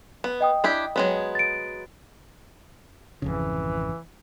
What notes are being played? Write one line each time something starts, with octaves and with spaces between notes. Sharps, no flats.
B3
D#5 G5 D#6
D4 E4 G4
F#3 G#3 B3
A6 D7
G#1 F2 C#3 E3